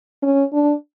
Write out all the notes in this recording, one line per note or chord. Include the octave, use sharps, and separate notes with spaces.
C#4
D4